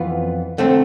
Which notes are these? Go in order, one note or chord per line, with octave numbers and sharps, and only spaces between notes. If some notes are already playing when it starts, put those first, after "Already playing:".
Already playing: F2 E3 B3 F4 B4
D3 A3 C4